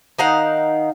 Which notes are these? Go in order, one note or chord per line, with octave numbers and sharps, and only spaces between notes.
D#3 D#4 F5 F#5